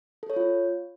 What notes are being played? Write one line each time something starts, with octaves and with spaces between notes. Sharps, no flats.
A4
C#5
F4